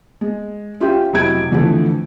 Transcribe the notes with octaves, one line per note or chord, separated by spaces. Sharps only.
G#3
C#4 F4 G4 E5 G5
F1 C3 F#3 E4 G#6 D7
F2 D3 E3 F3 A3